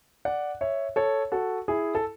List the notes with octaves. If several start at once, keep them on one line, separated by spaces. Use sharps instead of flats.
D5 F#5
C#5 E5
A4 C#5
F#4 A4
E4 G#4
A4